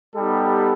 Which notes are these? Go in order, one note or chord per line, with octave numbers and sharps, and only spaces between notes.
G3 B3 D#4 G4 A4